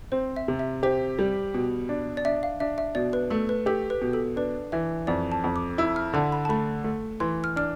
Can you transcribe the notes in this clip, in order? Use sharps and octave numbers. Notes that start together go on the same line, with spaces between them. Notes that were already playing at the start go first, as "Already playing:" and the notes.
C4 C5
E5
C3
E5
G4 C5
G3
B2
D4
D5
D4 E5
F5
D4 E5
E5
B2 D5
B4
A3 A4
B4
G4 A4
B4
B2
A4
D4 B4
E3 E5
F2 D5
A5
F2
D6
E4 E6
F6
D3 A5
B5
A5
A3 B5
A3
E3 C6
F6
D4 F6